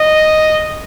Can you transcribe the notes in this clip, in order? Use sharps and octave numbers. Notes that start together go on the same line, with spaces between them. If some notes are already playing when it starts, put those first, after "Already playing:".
Already playing: D#5